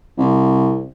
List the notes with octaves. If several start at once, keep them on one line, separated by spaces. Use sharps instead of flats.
C2